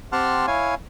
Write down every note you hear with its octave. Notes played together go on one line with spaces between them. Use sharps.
C4 G4 F#5 A5 C6 F6
E4 C#5 F5 G#5